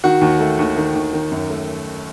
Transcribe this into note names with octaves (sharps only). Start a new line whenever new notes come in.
D#3 F#4
D#2
A3
D#2
D#3
D#2
D#3
F#2
A3